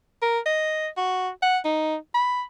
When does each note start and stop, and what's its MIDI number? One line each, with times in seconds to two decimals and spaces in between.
0.22 0.39 70
0.46 0.88 75
0.97 1.29 66
1.43 1.58 78
1.65 1.96 63
2.15 2.43 83